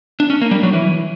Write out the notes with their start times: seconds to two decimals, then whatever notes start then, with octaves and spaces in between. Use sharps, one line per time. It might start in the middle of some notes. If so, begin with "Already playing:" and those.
0.20 D4
0.30 C#4
0.41 A#3
0.51 G3
0.63 F#3
0.73 E3